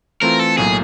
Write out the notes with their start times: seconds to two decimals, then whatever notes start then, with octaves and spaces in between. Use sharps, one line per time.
0.22 E3 A3 C4 F4 A#4
0.39 A4
0.58 B1 A2 F#3 A#3 G#4